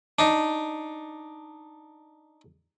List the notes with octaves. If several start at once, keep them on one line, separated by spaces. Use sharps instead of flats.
D4 D#4